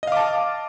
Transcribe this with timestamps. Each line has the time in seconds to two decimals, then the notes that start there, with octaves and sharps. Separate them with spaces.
0.03 D#5
0.07 F5
0.12 D6
0.17 A5